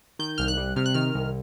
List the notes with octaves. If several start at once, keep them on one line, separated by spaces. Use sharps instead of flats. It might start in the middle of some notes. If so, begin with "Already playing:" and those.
D#3 G6
C2 F6
F#6
G3
C3 F6
F#6
D#3 F6
C2